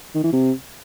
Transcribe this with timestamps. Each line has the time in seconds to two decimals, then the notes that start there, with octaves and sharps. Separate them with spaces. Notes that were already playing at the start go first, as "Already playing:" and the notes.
0.15 D#3
0.24 E3
0.33 C3